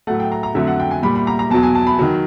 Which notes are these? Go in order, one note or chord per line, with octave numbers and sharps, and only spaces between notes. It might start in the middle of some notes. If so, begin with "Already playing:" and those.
A2 F#3 A3 F#5
G5
A#5
A#5
F2 D3 F#3 A3 E5
F#5
G5
G#5
A#2 G3 B5
B5
A#5
A#5
E2 B2 F#3 A5
G#5
A5
B5
D#3 F#3